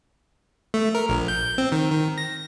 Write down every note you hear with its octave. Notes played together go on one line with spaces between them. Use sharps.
A3
A#4
A#1
G6
C4
D#3
D#3
A#6